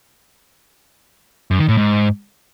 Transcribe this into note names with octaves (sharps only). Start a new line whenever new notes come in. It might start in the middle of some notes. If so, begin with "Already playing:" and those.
F#2
D#3
A2
G#2